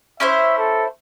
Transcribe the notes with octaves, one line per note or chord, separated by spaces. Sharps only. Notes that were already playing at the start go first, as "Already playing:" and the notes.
C#4 E4 C5 E5
A4